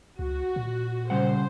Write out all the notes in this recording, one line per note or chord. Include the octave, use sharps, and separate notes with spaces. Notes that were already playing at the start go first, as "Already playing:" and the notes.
C#2 F#4
A#2
C#3 G3 C5 F#5